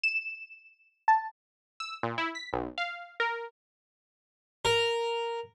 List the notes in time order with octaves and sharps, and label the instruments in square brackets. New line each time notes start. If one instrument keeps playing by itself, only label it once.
[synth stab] E7
A5
E6
A#2
E4
B6
B1
F5
A#4
[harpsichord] A#4